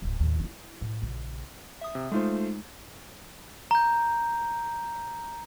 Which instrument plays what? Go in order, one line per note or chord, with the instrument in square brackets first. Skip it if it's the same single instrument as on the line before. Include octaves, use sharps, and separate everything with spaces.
[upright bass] D1 G#2
D#2 A2
D4 E4
A2
A#1 C#3
[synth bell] E5 D#6
[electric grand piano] C3
[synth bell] G#3 D#4 [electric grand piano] A3 F4 C5
[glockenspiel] A#5 G6